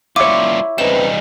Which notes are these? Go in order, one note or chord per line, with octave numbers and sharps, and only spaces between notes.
G3 E4 F4 C#5 D6
C#3 G3 C4 D#4 B4 E7